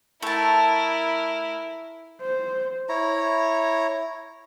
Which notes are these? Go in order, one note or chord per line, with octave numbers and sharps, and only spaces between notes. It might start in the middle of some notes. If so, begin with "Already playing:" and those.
A3 E4 A#4 A5
C5
E4 C#5 A#5